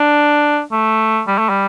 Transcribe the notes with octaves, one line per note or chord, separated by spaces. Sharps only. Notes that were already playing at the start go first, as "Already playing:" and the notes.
Already playing: D4
A3
G3
A3
G3